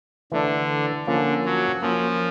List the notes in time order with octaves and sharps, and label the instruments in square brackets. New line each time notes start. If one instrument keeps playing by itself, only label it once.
[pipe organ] D3 [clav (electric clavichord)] E3 A3 D4
[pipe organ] D3 [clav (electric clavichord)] F3 A#3 C#4
[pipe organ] F#3
[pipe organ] F3 [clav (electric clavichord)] A#3 C#4 F4